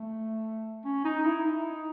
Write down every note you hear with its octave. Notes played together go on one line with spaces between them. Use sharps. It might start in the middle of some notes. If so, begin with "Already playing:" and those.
Already playing: A3
C#4
D#4
E4
D#4